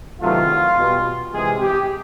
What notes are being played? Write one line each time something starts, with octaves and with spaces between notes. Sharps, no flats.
E2 C3 D#3 F#3 A3 F4
B2 G3
C3 E3 G#3 G#4
G4